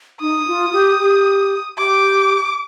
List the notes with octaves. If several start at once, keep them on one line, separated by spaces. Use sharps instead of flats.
D#4 D#6
F4
G4
G4
G4 D6